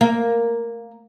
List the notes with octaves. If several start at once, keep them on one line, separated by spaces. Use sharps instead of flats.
A#3